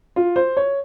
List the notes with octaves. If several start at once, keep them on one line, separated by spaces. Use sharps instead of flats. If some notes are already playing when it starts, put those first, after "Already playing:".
F4
C5
C#5